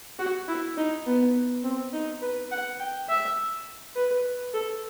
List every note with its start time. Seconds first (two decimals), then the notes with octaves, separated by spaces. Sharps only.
0.19 F#4
0.48 E4
0.77 D#4
1.06 B3
1.64 C4
1.93 D#4
2.21 B4
2.51 F#5
2.80 G5
3.09 E5
3.96 B4
4.54 A4